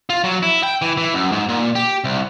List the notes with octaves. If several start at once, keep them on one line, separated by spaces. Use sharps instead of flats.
F4
F#3
E4
G5
E3
E3
F#2
G#2
A#2
G4
C2